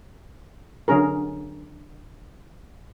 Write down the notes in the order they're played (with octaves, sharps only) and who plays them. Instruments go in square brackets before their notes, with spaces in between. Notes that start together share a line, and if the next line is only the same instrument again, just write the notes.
[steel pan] D3 F#3 C#4 G#4 A#4